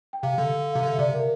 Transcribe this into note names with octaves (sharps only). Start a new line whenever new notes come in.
G5
C3 F5
D3
C3 F5
D3 E5
C3 D5
A#4